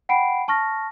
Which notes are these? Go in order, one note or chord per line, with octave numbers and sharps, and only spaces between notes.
F#5 G5 B5 C7 D7
A5 C#6 F6 A#6